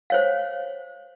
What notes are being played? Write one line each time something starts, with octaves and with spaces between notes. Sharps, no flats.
C5 C#5 F5